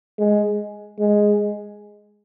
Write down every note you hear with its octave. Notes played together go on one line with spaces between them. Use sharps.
G#3
G#3